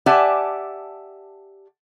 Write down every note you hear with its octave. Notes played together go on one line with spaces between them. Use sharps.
G4 D5 E5 F#5 G#5 A5